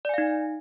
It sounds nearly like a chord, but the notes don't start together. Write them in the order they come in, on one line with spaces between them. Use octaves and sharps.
D5 G#5 F5 D#4